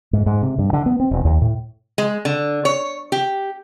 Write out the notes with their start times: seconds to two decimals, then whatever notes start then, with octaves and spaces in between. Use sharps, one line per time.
0.13 G#2
0.26 G#2
0.42 C3
0.58 G2
0.73 D3
0.86 B3
1.00 C4
1.11 E1
1.25 D#2
1.42 A2
1.98 G#3
2.25 D3
2.65 C#5
3.12 G4